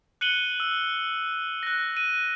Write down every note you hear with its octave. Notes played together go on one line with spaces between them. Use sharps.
F#6 C#7 D#7 F#7 G7
E6
F#6 A#6
D#7